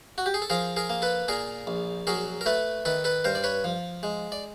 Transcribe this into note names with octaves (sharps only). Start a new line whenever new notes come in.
F#4
G4
G#4
A4
F3 G#4 A#4
G#4 A#4
A#3
A4 B4
A#2 G#4 A#4
A#1
F#3 G#4 A#4
A#4
A3 A4 B4
D#3 A4 B4
A4 B4
G2 A#4 C5
D5
B4 C#5
F3
G#3
D5